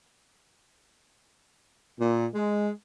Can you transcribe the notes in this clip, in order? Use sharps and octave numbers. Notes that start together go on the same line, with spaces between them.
A#2
G#3